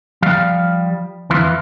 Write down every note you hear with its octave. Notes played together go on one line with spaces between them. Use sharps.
F3 G3 F5
F2 E3 E4 F4